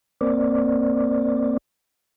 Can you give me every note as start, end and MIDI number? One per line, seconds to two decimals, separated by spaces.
0.21 1.57 58
0.21 1.57 60
0.21 1.57 74